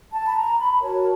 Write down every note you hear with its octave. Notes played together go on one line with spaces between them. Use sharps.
A5
B5
A#5
B5
F#4 A#4 C#5 A5